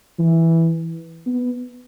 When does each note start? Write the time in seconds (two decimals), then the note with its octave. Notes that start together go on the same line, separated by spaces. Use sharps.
0.19 E3
1.26 B3